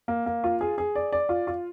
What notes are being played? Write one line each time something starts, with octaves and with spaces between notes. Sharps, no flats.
A#3
A#3
F4
G#4
G#4
D5
D5
F4
F4